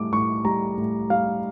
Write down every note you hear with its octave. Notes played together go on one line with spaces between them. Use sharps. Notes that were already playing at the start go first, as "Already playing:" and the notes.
Already playing: A2 G3 D6
A2 C#6
G3 A#5
A2
G3 F5